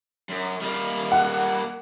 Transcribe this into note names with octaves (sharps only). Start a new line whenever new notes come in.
F#2
G3 A#3
F#5